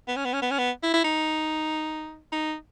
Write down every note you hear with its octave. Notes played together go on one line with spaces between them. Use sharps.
B3
C#4
B3
C#4
B3
C#4
B3
E4
E4
D#4
D#4